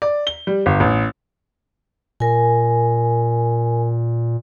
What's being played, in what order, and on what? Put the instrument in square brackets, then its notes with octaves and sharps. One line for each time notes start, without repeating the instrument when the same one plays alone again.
[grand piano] D5
G7
G3
G1
A1
[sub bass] A#2 [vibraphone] A#4 G#5